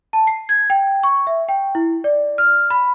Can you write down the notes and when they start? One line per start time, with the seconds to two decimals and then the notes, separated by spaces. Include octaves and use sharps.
0.13 A5
0.27 C7
0.49 G#6
0.70 G5
1.03 C#6
1.27 E5
1.49 G5
1.75 E4
2.04 D5
2.38 F6
2.70 B5